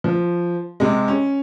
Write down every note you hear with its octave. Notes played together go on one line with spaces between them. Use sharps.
F3
C3 G#3
C#4